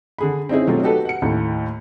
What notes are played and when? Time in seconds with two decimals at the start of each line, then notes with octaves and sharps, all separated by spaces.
0.18 D3 G#4 B5
0.49 C4 C#4 D#4 E4 G#4
0.67 B2 F#3 A3 C4 F4 G4
0.82 D#4 F#4 G4 A4 B4
1.05 F#5 C#7
1.22 D#2 A2